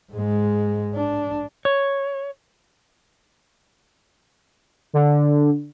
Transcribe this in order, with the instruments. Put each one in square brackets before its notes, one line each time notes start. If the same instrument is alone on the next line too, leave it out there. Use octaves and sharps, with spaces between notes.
[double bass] G#2 G#3
D4
[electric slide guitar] C#5
[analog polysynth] D3